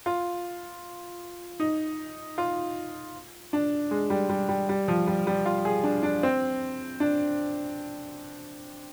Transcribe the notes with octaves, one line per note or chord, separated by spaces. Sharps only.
F4
D#4
F4
D4
G#3
G3
G3
G3
G3
F3
G3
G3
F4
G#4
D4
D4
C4
D4